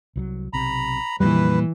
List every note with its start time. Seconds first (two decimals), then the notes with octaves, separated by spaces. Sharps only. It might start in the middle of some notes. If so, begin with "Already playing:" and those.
0.16 C2 E3 F#3
0.53 B1 C3 A#5 B5
1.20 F2 A#2 D3 E3 F3 G3 B4